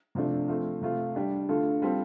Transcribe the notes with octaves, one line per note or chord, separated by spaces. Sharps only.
C3 F3 A3 D4
F3 A3 C4
C3 A3 F4
G3 D4 G4
D3 A3 F4 A4
G3 C4 F4 A4